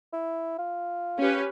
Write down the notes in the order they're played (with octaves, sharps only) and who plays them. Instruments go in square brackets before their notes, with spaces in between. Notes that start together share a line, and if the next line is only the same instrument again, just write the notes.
[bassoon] E4
F4
[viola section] C#4 G4 B4